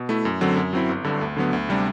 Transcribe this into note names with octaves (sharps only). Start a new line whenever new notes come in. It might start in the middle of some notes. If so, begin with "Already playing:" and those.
Already playing: B2
A3 E4
F#2
D3 F#3 C4
F#2
F#3 C4 E4
G1
G2 D3
D2
D3 F#3 B3
D2
C3 G3 D4